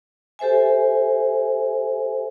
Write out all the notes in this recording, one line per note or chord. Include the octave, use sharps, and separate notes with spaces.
G4 A4 C5 E5 G#5